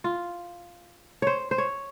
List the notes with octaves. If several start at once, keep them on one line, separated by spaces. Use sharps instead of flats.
F4
C5 C#5
C5
C#5